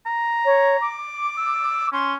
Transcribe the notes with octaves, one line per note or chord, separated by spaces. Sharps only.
A#5
C#5
D6
E6
C#4 C6